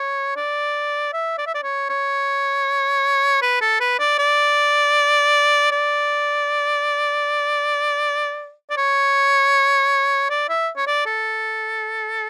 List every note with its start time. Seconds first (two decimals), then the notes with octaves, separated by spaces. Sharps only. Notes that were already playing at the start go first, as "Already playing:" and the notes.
Already playing: C#5
0.36 D5
1.13 E5
1.38 D5
1.46 E5
1.54 D5
1.63 C#5
1.90 C#5
3.42 B4
3.61 A4
3.80 B4
3.99 D5
4.19 D5
5.71 D5
8.70 D5
8.77 C#5
10.30 D5
10.49 E5
10.77 C#5
10.87 D5
11.06 A4